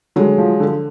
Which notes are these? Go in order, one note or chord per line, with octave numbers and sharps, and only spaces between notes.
D3 F#3 G#3
F3
D3